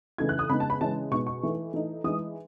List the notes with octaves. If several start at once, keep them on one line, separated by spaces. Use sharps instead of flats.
C#3 E3 A3 D#4 G#6
F#6
D#6
C#3 G#3 B3 D#4 B5
A5
B5
C#3 E3 G#3 C#4 A5
B2 G#3 D#4 C#6
C#6
E3 A3 D#4
E3 A3 D#4
E3 G#3 D#4 D#6